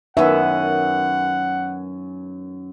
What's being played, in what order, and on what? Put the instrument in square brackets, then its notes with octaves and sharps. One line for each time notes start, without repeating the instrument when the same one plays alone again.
[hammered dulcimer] F#2 G#5 [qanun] D#3 B3 [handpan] E5 [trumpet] F#5